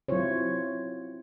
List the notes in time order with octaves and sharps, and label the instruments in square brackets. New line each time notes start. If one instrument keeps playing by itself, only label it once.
[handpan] F#3 C4 E4 F4 C5 C#5